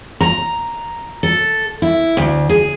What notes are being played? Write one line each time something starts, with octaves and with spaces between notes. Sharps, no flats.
A#5
A4
E4
D2
G#4